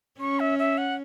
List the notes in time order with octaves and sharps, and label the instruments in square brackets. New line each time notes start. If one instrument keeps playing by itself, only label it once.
[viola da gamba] C#4 [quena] C#6
[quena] E5
E5
F#5